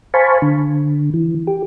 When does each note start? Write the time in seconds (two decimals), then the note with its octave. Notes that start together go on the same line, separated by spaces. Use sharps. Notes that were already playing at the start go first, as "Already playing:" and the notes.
0.14 C5 F5 G#5 A5 B5 C#6
0.42 D3
1.14 E3
1.47 G4